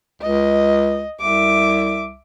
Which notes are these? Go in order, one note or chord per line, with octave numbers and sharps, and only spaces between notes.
C#2 D#5
C2 E5 D6